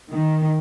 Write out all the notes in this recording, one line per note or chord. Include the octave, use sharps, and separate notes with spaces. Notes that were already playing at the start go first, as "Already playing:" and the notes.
D#3